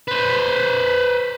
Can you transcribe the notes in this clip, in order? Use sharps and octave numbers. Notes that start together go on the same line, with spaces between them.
B4 C5